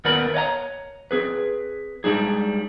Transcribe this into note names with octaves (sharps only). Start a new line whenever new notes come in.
D#2 B3 A#4 D5 B5
C#5 D#5 F5 A#5
C4 G#4 B4
G3 G#3 D4 D#4 G#4